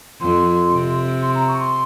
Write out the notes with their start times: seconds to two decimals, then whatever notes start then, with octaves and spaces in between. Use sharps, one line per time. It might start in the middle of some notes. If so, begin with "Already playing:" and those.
0.21 F2 C6
0.72 C3
1.22 C6
1.35 A#5
1.48 C#6
1.60 C6